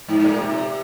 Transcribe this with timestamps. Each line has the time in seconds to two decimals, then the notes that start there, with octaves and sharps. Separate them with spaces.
0.08 G#2
0.24 A#2
0.40 C3